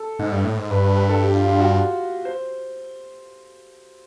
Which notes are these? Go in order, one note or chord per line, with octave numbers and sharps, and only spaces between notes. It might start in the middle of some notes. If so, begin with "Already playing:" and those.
Already playing: A4
G#2
G2
A2
G#2
G2 B4
B4
B4
A4
G4
F4
F4
F#4
C5